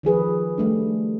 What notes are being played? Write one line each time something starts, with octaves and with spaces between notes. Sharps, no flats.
D#3 F3 G#4 B4
G3 A3 D4